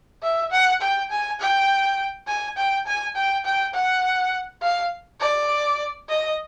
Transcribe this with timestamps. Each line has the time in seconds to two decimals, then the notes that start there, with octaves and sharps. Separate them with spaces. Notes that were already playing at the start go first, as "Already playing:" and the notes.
0.23 E5
0.51 F#5
0.81 G5
1.10 G#5
1.39 G5
2.27 G#5
2.57 G5
2.86 G#5
3.16 G5
3.45 G5
3.74 F#5
4.62 F5
5.20 D5
6.09 D#5